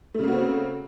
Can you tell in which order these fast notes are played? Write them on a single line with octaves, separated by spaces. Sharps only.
A3 C#3 A#3 F#4 C4